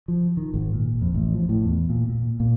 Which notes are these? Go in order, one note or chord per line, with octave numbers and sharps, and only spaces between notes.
F3
D#3
G#1
A#2
F2
A1
F3
A2
E2
A#2
A#2
A#2